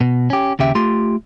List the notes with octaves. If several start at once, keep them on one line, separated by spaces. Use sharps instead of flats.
B2
C#4 G4
D#2 C#3 G4 E5
A3 F4 G4 C6